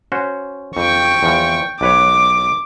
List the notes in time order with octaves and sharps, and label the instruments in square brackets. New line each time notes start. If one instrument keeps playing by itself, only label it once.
[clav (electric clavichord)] C#4 F#4 C5
[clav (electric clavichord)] F2 [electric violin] G5 C#6
[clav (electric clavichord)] E2 F3
[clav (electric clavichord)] B1 B4 C#5 [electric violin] D6